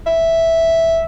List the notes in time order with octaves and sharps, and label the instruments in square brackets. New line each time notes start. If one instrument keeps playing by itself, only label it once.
[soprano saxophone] E5